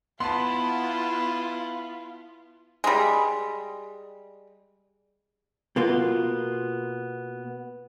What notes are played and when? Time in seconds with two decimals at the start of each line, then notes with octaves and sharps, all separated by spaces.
0.20 B3 E4 F4 B4 A5 C6
2.84 G3 G#3
5.76 B2 A#3 B3 F4